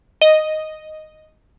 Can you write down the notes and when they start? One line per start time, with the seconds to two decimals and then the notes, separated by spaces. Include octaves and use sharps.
0.21 D#5